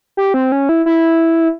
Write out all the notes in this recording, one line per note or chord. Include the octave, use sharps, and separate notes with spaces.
G4
C4
C#4
E4
E4